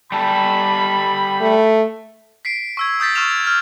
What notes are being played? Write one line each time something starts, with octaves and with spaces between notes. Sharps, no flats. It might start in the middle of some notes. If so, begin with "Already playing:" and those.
G3 A4 B5
A3
B6 C7 D7
C#6 E6 G#6
D#6 G6 A6 B6
C#6 E6 F6 E7 F7
F6